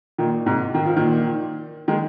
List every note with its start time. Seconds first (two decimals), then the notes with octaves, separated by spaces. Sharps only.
0.18 A#2 D#3
0.46 G#2 C3
0.75 D#3
0.86 F3
0.97 A#2 D#3
1.88 D#3 G#3